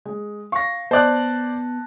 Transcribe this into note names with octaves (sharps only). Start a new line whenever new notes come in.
G#3
F5 C#6 A#6
B3 C5 D5 A5 F#6